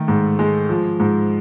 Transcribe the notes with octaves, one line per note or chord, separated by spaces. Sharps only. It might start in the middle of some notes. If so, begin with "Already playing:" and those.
Already playing: D#3 A3
G#2
G#3
F3
G#2